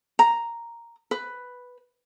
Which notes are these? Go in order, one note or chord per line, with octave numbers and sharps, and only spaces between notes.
A#5
B4